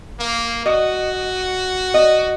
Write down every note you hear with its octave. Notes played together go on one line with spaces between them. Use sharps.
A#3
F#4 D#5
D#5